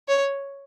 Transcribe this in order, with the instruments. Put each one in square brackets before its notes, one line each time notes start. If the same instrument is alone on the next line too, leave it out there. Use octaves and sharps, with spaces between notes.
[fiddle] C#5